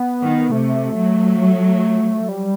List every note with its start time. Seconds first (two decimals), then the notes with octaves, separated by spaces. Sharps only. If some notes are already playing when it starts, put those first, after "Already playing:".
Already playing: B3
0.22 D#3
0.51 C3 A3
0.95 F#3
2.29 G3